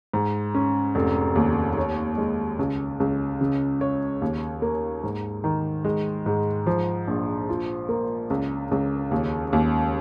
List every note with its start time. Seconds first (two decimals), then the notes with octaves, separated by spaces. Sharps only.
0.14 G#2
0.55 C#4
0.95 F1
1.35 D#2
1.77 C#5
2.18 G#3
2.59 C#2
3.00 C#2
3.41 C#3
3.81 C#5
4.22 D#2
4.62 A#3
5.03 G#2
5.44 D#3
5.85 G#3
6.26 G#2
6.66 F3
7.08 A#1
7.49 F4
7.89 A#3
8.30 C#2
8.71 C#2
9.11 D#2
9.53 D#2